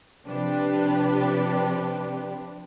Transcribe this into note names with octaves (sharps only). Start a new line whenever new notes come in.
C3 F3 D4 G4 B4